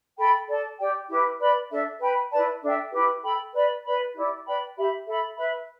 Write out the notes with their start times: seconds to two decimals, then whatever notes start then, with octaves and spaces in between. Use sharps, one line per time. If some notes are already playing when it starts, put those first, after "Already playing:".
0.17 A4 G5 B5
0.47 A4 D5 A5
0.78 G4 D5 G5
1.08 E4 G4 B4
1.39 B4 D5 B5
1.70 D4 A4 E5
2.00 B4 G5 B5
2.31 E4 B4 D5 A5
2.61 D4 A4 E5 G5
2.92 E4 G4 B4
3.22 A4 G5 B5
3.52 B4 D5 B5
3.83 B4 D5 B5
4.14 E4 G4 D5
4.45 B4 D5 G5 B5
4.75 G4 E5 B5
5.05 A4 E5 B5
5.36 B4 E5 B5